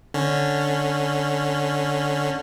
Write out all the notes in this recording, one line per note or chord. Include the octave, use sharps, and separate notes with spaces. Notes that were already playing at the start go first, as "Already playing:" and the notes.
D3 C#4